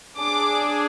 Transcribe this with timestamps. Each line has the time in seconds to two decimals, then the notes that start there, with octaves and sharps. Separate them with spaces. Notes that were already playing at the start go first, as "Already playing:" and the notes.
0.17 D4 G#4 D6